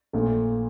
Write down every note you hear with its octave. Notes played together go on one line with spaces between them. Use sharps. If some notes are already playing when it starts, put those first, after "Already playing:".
A#1 A#2 A3